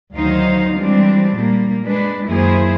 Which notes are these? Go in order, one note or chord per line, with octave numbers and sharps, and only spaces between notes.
D2 D#3 F#3 D#4 C5 F5
E3 G3 G#3 C4 D4
A#2 G3 A#3
G#3 D4 B4
F#2 D#3 A#3 E4 G#4 C5